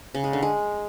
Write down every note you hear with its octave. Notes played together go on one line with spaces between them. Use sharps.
C#3
G#3
D3
G#3